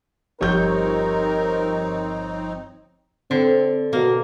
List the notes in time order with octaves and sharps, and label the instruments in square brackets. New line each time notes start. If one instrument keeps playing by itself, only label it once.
[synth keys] G1 F3 C#5 [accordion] C4 D#4 [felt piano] G4 G6 [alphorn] A#4
[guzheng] D3 [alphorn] C4
[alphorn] B2 [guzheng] A#3